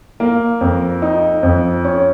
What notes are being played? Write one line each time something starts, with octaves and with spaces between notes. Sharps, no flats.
A#3
F2
D#4
F2
C#4